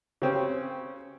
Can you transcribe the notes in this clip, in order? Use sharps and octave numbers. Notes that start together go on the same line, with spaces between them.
C#3 C4 C#4 G4